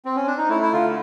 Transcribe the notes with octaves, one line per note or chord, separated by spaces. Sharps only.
C4
C#4
D4
D#4
A3 E4
E4
D3 F4